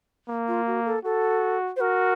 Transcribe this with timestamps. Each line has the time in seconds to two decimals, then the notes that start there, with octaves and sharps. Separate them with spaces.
0.29 A#3
0.48 F4
0.67 F#4
0.86 A4
1.04 F#4 A4
1.76 C5
1.81 F#4 A#4